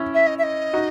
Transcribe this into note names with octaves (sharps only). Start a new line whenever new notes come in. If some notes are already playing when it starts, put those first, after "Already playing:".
Already playing: C#4 E4
E5
D#5
E5
D#5
D#4 F#4